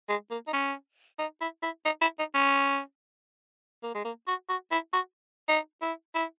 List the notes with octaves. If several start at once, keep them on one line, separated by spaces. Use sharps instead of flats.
G#3
A#3
D#4
C#4
D#4
E4
E4
D#4
E4
D#4
C#4
A#3
G#3
A#3
F#4
F#4
E4
F#4
D#4
E4
E4